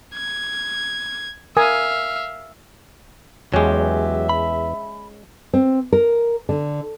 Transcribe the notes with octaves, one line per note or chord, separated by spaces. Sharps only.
G#6
A#4 E5 F5 G#5 D#6
E2 F#3 G#3 C#4 G4 E5
B5
C4
A#4
D3